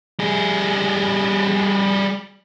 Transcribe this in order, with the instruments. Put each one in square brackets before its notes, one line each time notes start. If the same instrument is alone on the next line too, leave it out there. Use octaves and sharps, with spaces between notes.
[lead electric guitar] G3 G#4